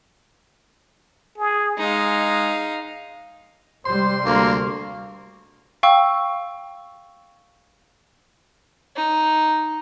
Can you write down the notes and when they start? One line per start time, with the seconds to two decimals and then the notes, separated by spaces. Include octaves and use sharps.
1.38 G#4
1.78 G#3 D#4 F5
3.85 C3 G3 C5 C6
4.25 D2 A#3
5.83 F5 G5 C#6 E6
8.96 D#4